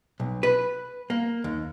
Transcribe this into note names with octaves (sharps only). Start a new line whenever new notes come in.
B1
B4
A#3
D#2